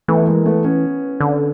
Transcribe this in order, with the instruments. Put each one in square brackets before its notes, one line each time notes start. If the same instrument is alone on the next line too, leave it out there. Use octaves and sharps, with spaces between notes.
[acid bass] E3 [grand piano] A3 B3
[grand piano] G#3 A#3
A3 B3
B3 C#4
[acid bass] D3